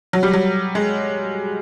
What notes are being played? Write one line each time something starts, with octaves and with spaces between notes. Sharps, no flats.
F#3
G3
F#3
G#3